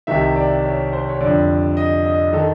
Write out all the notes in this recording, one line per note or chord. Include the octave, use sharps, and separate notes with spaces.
C2 C3 D#3 E5
D5
C#5
C5
C#5
F2 D3 D5
D#5
D#5
D#3 A4